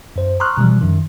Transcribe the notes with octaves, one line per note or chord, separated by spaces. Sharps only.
F#2 C5
A#5 C6 C#6 D#6 F6 F#6
B2 E3 F3 G3
F#2 D#3